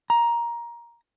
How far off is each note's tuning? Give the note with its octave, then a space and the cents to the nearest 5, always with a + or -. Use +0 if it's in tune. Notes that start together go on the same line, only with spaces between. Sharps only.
A#5 +15